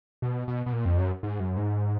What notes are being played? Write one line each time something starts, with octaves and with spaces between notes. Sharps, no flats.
B2
B2
B2
A#2
F2
F#2
G#2
F#2
G#2